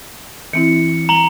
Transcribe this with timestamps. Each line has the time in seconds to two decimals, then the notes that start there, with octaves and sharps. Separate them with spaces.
0.53 E3 C4 E4 C#7
1.09 A#5 F#7 G7